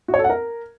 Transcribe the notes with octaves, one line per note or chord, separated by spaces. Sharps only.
F#4
C#5
A4
F#5
A#4